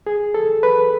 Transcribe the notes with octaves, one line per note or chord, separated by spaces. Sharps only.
G#4
A4
B4